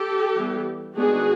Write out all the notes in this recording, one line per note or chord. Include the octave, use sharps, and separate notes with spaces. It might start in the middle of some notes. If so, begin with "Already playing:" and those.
Already playing: G4 A4
E3 G3 B3
D#3 G#3 B3 D4 F#4 G#4